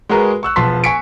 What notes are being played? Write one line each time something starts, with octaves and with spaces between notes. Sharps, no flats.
G#3 F#4 G#4 A#4 B4
C#6 E6 F#6
E1 F3 B3 A5 C6 B6
G#5 C#6 B6 C#7 D7